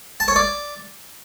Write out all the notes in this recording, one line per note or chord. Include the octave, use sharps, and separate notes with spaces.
A5
C#5
D5